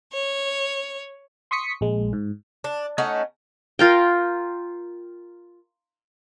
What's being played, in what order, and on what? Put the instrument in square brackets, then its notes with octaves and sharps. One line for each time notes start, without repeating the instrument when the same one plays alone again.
[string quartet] C#5
[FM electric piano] C6 C#6 D#6 B6 C#7
A#1 G#3
G#2
[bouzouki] D4
A3 C#4 D#4 F#5
[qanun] F4 A#4 G5